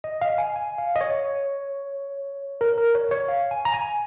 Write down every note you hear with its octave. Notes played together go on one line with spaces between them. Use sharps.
D#5
F5
G#5
G#5
F5
D#5
C#5
A#4
A#4
C#5
C#5
F5
G#5
A#5
G#5